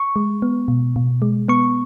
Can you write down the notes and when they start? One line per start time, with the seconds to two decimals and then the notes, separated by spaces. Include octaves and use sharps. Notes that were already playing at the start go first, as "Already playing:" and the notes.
Already playing: C#6
0.16 G#3
0.42 B3
0.68 B2
0.96 B2
1.22 G#3
1.48 B3 C#6